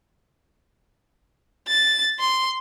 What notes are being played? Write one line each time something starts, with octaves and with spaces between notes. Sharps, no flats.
A6
C6